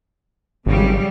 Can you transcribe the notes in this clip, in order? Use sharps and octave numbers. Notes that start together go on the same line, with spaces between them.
G#1 C#3 F#3 G3